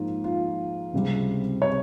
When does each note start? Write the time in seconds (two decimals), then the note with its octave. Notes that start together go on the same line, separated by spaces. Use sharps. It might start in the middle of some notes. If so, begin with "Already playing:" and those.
Already playing: G#2 F3 A#3 D#4 F4
0.24 F4
0.93 C#2 C3 G3 C4
1.62 C#5